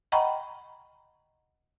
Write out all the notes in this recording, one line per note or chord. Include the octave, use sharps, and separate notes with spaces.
D#5 F#5 G5 A#5 B5 C#6